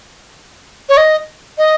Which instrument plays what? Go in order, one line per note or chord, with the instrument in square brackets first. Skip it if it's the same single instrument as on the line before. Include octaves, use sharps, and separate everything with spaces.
[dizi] C#5
D#5
D#5